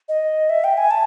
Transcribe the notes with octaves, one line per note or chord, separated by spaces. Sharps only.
D#5
E5
G5
G#5
A5